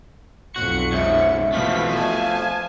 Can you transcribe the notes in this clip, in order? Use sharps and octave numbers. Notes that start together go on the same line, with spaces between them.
B1 F2 F#4 C#7
G#2 C#3 E5
B2 E3 F3 A3 F5 B6
G#5 A5